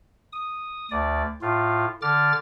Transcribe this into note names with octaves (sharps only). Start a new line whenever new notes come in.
D#6
D2 D5
A2 F4
D3 D6 F6 A6